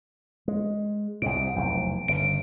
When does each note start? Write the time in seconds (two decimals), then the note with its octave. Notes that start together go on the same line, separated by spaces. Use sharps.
0.48 G#3
1.22 C2 G#2 D7
1.55 F1 B1 E2
2.08 G1 C#3 D7